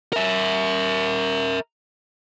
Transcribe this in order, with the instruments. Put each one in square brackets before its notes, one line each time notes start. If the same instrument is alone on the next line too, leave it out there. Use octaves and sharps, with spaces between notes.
[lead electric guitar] A#4 E5